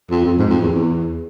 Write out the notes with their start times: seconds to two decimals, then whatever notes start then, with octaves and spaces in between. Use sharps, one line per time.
0.10 F2
0.25 F2
0.38 G#2
0.50 F2
0.61 E2
0.73 E2